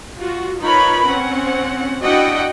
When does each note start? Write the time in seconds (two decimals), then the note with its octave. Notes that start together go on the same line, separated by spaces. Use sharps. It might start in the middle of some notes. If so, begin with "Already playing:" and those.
0.18 F4 F#4
0.60 D#4 F4 A#4 B4 C#5 B5
1.04 C4 C#4 F#5
2.02 D4 E4 F#4 D#5 F#5 G5